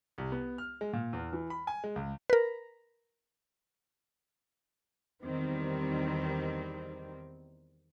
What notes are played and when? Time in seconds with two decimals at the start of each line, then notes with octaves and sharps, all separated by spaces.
0.18 C2
0.32 B3
0.58 F6
0.81 G#3
0.93 A#2
1.13 E2
1.33 E3
1.50 B5
1.67 G#5
1.84 G#3
1.96 C#2
2.30 A#4 B4
5.24 E2 D#3 G3 C4